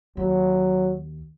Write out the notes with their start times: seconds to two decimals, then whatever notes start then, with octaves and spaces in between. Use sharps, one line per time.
0.17 D#2 F#3